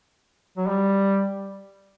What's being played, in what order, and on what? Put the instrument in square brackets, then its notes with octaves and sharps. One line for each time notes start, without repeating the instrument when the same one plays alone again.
[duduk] F#3
G3